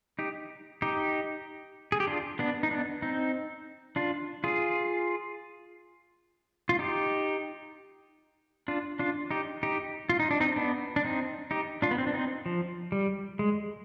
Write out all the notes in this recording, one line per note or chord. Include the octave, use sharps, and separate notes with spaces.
D#4 G4
D#4 G4
G#4
G4
D4 F4
B3 D4
D#4
B3 D4
C4 D#4
D4 F4
F4 G#4
F4
D#4 G4
D4 F4
D4 F4
D#4 G4
D#4 G4
F4
D#4
D4
C4 D#4
B3 D4
D4
C4 D#4
D#4 G4
D4 F4
B3
C4
D4
C4 D#4
F3
G3
G#3